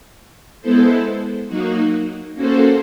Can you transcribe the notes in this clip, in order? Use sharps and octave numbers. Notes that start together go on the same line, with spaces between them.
G#3 B3 E4 A4 C5
F#3 A#3 D#4 F#4
A#3 C#4 F#4 A4 C5